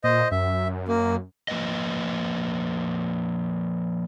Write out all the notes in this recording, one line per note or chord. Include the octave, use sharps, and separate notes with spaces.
A#2 C5 D#5
F#2 E5
A#3
F3 A#3 B4 D#5